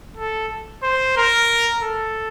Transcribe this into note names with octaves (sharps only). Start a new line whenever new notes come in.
A4
C5
A#4
A4